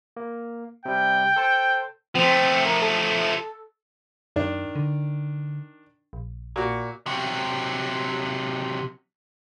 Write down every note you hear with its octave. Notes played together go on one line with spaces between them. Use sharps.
A#3
C3 G3 G5
A4 C5 A5
F3 A3 C4
A#4
A4
F#2 D#3 D4
D3
A#1
A#2 F#4
C3 F#3